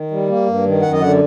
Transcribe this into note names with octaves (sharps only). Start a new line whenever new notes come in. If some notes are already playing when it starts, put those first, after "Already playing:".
Already playing: D#3
G3
A#3
G2
D#3
F#2 F#5
D#5
D3 F#5